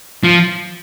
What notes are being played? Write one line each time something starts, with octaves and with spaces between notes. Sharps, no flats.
F3